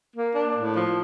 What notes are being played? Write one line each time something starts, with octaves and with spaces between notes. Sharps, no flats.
A#3
D4
A2
F3